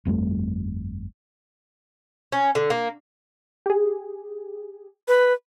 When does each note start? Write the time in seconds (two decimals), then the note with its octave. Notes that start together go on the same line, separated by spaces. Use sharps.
0.05 G1 F2 G3 A3
2.32 C#4
2.55 D3
2.70 A#3
3.66 G4 G#4
5.08 B4